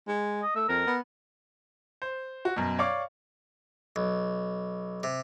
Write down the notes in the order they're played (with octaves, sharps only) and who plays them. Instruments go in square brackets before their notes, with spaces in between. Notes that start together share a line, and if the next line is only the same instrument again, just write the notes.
[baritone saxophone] G#3
[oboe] D#5
[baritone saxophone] A3 [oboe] E6
[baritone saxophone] F2 [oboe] A#4
[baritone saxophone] B3
[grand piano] C5
F#4
F#2 B2
C#5 D5 F5 C#6 D6
[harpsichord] B1
C3